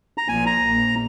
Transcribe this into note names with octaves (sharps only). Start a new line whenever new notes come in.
A#5
A#1 A#2 F3 G#5
A#5
A#1 A#2 A#3